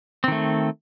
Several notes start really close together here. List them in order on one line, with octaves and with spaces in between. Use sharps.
C4 D#3 A3